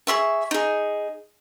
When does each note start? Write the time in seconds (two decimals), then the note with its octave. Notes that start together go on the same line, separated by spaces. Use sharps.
0.07 G#4 A#4 E5 C#6
0.51 D#4 G#4